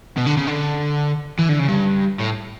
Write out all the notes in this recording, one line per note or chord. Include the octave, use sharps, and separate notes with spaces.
B2
D3
C#3
D3
E3
D3
C#3
G2
A2